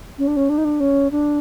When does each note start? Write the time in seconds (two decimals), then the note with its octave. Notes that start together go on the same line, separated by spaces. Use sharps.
0.18 C#4
0.27 D4
0.36 C#4
0.49 D4
0.58 D#4
0.64 D4
0.80 C#4
1.11 D4